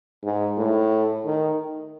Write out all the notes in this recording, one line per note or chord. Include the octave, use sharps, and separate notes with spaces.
G#2
A2
D#3